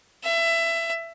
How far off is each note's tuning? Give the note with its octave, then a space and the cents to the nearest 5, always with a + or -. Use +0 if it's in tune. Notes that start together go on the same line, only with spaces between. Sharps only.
E5 +20